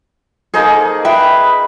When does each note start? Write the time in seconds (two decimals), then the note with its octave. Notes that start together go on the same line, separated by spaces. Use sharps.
0.54 A#3 D#4 G#4 A4 C5
1.05 B4 E5 G5